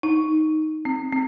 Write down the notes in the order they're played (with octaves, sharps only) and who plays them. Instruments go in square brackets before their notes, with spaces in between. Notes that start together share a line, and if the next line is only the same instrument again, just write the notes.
[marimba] D#4
C4
C4